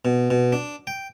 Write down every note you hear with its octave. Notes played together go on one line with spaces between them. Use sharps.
B2
B2
D4
G5